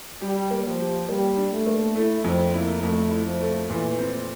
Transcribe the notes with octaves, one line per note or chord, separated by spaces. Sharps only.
G3 G4
A#3
F3
G4
G3 A#3
D4
A3
A#3
A3 E4
F2 C4
A#3 E4
F2 A3
E4
F3
A3
A#2 E3
C4